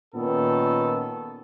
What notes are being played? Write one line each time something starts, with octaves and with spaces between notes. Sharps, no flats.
A#2 D#3 B3 C#4 A4